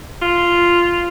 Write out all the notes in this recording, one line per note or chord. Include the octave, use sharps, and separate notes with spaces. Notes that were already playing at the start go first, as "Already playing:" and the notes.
F4